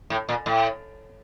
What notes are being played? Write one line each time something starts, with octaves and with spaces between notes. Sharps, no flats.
A2
A#2
A2